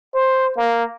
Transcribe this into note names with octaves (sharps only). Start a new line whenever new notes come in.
C5
A#3